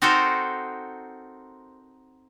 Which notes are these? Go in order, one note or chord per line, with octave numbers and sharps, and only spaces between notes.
C4 D#4 F#4 A4 A#4 C5